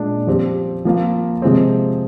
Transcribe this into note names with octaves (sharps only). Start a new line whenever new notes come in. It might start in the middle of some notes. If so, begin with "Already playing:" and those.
Already playing: A#2 G#3 D4
F3 C4 G4
F3 A#3 F4
C3 F3 G#3 C4